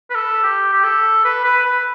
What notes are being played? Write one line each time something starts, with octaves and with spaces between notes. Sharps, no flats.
B4
A4
G4
G4
A4
B4
B4
B4